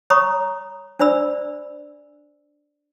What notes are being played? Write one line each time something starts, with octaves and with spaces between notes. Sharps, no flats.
C#5 A#5 B5 C#6 D#6
D4 C5 D5 B5 E6